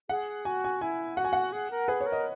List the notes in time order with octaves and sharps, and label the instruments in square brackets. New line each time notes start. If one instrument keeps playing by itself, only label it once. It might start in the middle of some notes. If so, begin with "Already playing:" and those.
[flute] G#4 [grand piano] F#5
[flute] F#4 [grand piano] G#5
[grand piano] G#5
[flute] E4 [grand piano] G#5
[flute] F#4 [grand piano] F#5
[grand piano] G#5
F#5
[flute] G#4
A#4
[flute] G#4 [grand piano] B4
[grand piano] C#5
[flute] A#4
[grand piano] D#5